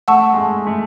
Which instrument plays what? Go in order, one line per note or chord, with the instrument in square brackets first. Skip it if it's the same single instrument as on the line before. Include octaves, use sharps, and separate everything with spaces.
[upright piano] A3 [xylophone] F#5 A5 C#6 E6
[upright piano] G#3
A3
A3